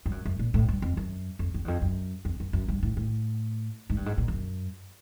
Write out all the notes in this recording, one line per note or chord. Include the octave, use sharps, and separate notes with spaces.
G2
F#2
F#2
A#2
A2
G2
F2
F#2
F2
F2
E2
F2
F#2
F2
F#2
F#2
G2
A2
A2
G#2
G2
G#2
A#2
F#2